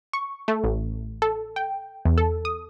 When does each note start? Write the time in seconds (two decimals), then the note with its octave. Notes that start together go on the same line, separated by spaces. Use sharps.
0.13 C#6
0.48 A3
0.64 A1
1.22 A4
1.56 G5
2.05 E2
2.18 A4
2.45 D#6